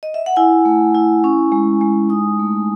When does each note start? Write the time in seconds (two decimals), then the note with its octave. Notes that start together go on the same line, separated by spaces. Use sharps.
0.03 D#5
0.14 E5
0.26 F#5
0.36 E4 G#5
0.65 A3
0.95 E4
1.24 C#4
1.52 G#3
1.81 G#3
2.09 D#4 D#6
2.39 A3